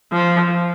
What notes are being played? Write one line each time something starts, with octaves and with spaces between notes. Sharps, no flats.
F3